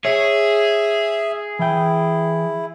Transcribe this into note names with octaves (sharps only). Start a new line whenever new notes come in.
G#4 C#5 E5
E3 E4 G5